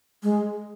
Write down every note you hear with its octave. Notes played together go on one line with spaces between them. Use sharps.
G#3